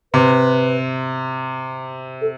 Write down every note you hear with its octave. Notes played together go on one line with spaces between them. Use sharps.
C3 B4
A4